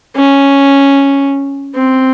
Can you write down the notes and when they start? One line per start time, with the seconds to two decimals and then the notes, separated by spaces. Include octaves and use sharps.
0.16 C#4
1.75 C4